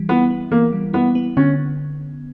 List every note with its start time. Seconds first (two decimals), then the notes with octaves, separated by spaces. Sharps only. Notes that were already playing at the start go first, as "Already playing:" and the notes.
Already playing: E3 G3
0.09 B3 E4
0.30 B3
0.52 E3 A#3
0.73 G3
0.94 B3 E4
1.15 B3
1.37 D3 C#4